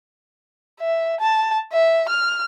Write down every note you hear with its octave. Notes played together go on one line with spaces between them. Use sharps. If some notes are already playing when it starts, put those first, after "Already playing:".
E5
A5
E5
F6